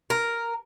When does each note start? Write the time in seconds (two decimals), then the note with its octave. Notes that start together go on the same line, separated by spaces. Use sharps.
0.10 A#4